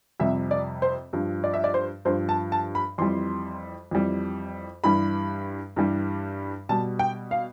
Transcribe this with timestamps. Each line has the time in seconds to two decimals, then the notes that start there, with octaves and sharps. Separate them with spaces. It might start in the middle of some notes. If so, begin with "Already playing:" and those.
0.20 F2 C3 G3 E5
0.51 D5
0.82 C5
1.13 G2 F3
1.44 D5
1.54 E5
1.64 D5
1.74 C5
2.05 G2 F3 C5
2.29 A5
2.52 A5
2.75 B5
2.98 F2 E3 G3 C6
3.91 F2 E3 G3
4.84 G2 E3 G3 B5
5.76 G2 E3 G3
6.69 B2 G3 A5
6.99 G5
7.31 F5